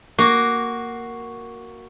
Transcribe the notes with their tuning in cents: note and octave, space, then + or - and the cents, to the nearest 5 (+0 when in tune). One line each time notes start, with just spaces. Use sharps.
A#3 +0 F#4 +0